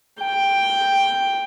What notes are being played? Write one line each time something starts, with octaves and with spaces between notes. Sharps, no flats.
G5